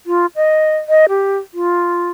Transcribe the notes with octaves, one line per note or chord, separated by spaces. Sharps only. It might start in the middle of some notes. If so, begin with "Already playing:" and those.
F4
D#5
D#5
G4
F4